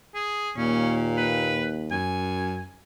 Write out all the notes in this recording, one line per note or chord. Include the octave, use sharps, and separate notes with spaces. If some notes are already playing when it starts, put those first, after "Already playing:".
G#4
D#2 A#2 C#4
B4
F#2 G#5